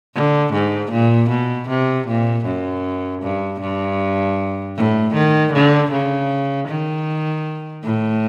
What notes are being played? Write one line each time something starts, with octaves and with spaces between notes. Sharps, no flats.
D3
G#2
A#2
B2
C3
A#2
F#2
G2
G2
A2
D#3
D3
C#3
D#3
A2